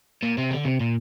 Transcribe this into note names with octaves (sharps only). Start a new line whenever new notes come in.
A#2
C3
D3
C3
A#2